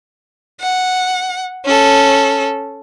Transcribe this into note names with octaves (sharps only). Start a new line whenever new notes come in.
F#5
C#4 A4